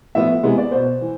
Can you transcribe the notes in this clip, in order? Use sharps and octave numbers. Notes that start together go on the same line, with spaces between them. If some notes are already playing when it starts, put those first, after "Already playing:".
A2 F3 B3 E5
C3 E3 G#3 B3
D5
B2 B3 C5
E3